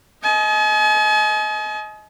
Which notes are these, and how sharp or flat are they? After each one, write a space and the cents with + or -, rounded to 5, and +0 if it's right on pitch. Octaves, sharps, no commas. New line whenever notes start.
D#5 +20 G#5 +45